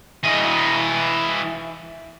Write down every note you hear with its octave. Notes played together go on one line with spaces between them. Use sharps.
E3 D#5